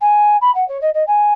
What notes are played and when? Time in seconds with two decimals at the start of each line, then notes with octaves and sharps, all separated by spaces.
0.01 G#5
0.41 B5
0.55 F#5
0.69 C#5
0.81 D#5
0.94 D#5
1.07 G#5